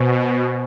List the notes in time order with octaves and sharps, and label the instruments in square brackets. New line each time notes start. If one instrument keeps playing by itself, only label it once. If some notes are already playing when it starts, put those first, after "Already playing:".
Already playing: [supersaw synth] B2 [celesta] C5 D#5 G#5 C#6